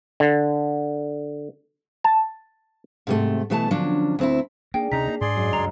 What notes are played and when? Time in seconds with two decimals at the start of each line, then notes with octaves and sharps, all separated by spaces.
0.20 D3
2.04 A5
3.07 G#2 C3 A3
3.50 B2 E3 A3 G#5 A5
3.71 D3 F3 F#3 C#4 D4
4.19 D2 C4 E4
4.74 A#3 D4 G#4 G5
4.92 D2 C3 C#4 D#4 A#5 B6
5.08 A#3
5.21 G#2 G#4 D5 C6
5.36 F#2 D#5 D#6
5.53 C#2 G2 A#5